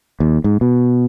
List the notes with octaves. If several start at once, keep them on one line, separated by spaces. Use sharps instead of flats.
D#2
G#2
B2